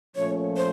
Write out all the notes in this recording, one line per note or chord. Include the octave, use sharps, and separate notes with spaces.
A#2 F3 A3 C#4 C#5
C5